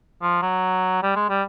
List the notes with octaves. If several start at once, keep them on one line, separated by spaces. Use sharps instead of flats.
F3
F#3
G3
G#3
G3